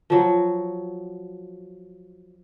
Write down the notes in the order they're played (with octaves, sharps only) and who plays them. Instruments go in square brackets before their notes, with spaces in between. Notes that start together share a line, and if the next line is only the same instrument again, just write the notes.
[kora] F3 F#3